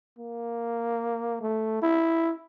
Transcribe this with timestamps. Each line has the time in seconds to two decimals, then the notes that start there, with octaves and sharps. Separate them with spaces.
0.18 A#3
1.41 A3
1.82 E4